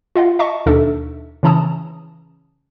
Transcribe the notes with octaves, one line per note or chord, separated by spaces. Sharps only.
F4 D#5 F5 F#5
D#5 E5 A5 C#6
D#2 B2 D4 D#4 A4 E5
C#3 E3 C#4 A5 A#5 D#6